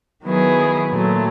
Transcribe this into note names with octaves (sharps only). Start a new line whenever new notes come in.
D#3 F#3 B3 E4 G#4
A#2 F#3 A3